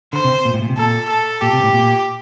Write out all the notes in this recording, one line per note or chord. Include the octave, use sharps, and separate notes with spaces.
D3 C5
C3
A#2
A2
A#2
C3
A#2 A4
A4
A#2 G4
C3
A2
A#2